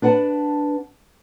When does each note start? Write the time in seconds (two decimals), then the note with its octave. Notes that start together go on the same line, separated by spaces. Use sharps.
0.02 D4 B4 F#5 G#5 A5